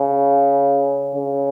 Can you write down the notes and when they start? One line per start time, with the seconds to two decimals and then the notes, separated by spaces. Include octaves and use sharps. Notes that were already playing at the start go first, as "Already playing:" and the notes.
Already playing: C#3
1.14 C#3